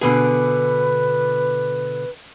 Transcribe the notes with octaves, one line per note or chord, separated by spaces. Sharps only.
B2 D3 G#4 B4